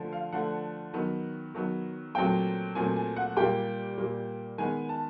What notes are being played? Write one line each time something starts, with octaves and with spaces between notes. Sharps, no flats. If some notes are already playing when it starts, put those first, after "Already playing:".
Already playing: D3 F3 A3
F5
D3 F3 A3 F#5
D#3 F#3 B3
D#3 F#3 B3
A#2 F#3 A3 C4 G5
A#2 F#3 A3 C4 G#5
G#5
F#5
A#2 G3 A#3 G5
A#2 G3 A#3
D#3 G#3 B3 G#5
A5